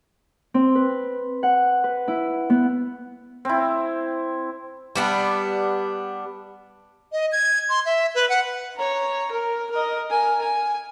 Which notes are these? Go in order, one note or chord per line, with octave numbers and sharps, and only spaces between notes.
C4
B4
F#5
B4
E4
B3
C4 E4
G3 B3 D4
D#5
G#6
C6
E5
B4
F#5
C#5 A#5
A#4
A#4 D#5
A#4 G#5
G#5